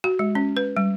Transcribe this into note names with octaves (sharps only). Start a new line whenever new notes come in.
F#4
G#3
C#4
B4
G3